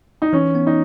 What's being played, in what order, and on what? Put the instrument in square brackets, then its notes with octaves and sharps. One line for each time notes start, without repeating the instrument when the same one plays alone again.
[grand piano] D#4
[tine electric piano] E3 [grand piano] C#4
[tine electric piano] B3
[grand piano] D#4